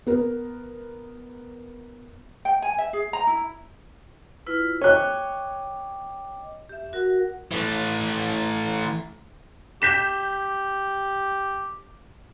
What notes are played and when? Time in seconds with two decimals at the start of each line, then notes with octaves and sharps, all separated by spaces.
0.07 B3 A#4
2.45 G5
2.62 G#5
2.78 E5
2.93 G#4
3.13 A#5
3.27 E4
4.47 E4 F4 B4
4.82 C#5 D#5 G5 D6 F#6
6.69 G4 E5
6.93 F#4 A#4 F#5
7.51 E3 A3
9.82 G4 G6 B6 E7